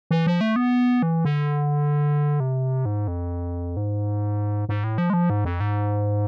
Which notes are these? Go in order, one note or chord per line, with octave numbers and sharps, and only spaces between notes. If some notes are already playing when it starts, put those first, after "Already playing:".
E3
F3
A3
B3
E3
D3
C3
G#2
F2
G#2
G#2
A2
F3
G#3
F3
G#2
F2
G#2